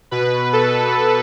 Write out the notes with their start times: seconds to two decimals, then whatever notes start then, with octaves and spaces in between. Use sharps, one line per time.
0.11 B2 B4
0.53 A4